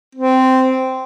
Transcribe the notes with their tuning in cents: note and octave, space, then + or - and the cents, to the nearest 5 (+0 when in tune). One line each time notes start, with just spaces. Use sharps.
C4 -10